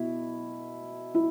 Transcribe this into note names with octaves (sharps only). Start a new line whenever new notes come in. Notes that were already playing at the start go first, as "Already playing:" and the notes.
Already playing: B2 E4
E4